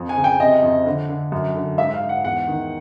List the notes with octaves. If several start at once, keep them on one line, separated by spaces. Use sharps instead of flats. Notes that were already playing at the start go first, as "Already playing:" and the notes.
Already playing: F2
G#5
C#3
G5
C3 D#5
F2
D3
D3
F#2
D3
G#2 E5
F5
G#2
F#5
E2 F#5
D#3